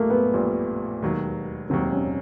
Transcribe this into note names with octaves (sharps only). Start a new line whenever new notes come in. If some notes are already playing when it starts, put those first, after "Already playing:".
Already playing: A#1 A#2 G3 A3 A#3
B3
A#1 A#2 G3
E1 D#2 D#3 F#3
E1 D#2 D#3 F#3 C4
C#4